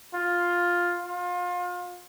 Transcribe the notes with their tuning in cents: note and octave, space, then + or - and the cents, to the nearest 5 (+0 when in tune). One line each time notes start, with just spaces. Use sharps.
F4 +5
F4 +30